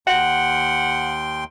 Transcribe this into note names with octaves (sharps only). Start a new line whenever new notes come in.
D#2 F#5 G5 C6